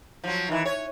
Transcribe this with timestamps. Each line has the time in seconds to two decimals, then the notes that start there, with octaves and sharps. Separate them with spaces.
0.24 F3 F#3
0.48 D#3 E3
0.65 C#5